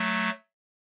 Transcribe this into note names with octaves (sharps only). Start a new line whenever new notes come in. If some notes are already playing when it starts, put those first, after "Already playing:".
Already playing: F#3 A3